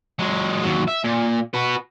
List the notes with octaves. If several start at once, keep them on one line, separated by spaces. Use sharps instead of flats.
F#3 G#3
D#2 F#3
E5
A#2
F#4 B4